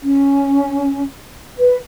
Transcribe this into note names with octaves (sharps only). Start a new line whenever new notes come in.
C#4
B4